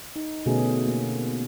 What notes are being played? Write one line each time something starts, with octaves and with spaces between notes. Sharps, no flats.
D#4
B2 D3 A3 B3 C#4 G#4
A#3